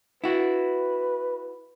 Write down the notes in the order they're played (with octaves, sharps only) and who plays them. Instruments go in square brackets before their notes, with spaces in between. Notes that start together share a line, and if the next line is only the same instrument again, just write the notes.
[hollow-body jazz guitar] E4 F#4 [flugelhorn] B4